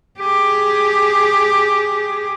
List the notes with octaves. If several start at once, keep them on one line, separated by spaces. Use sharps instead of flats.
G4 G#4